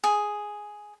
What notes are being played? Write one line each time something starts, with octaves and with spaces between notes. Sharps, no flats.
G#4